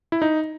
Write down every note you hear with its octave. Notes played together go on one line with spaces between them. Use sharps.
E4
D#4